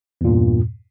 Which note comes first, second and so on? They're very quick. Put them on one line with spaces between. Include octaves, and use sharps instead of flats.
E2 A#2 G2